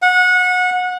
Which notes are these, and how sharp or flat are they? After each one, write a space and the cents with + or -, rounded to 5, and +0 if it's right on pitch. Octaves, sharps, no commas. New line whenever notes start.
F#5 -25